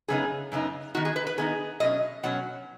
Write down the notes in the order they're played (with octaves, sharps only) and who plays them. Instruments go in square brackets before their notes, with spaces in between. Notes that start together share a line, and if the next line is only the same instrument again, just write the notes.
[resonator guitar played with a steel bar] F#2 C#3 B3 D#4 G#4
F#2 C#3 B3 D#4
D#3 B3 D#4 F#4
G#4
B4
B4
D#3 B3 D#4 G#4
B2 F#3 C#4 D#5
B2 F#3 C#4 F#5